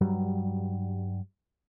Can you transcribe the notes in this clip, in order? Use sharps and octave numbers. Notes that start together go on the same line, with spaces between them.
G2 F#3 G3